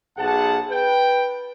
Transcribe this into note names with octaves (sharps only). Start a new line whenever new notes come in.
B1 G#4 F#5 A5
B4 G5